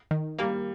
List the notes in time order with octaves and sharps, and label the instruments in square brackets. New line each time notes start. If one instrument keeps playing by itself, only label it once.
[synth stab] D#3
[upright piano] G3 [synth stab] A#3